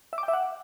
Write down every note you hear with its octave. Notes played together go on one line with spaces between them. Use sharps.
E5
D6
G5
E5
F#5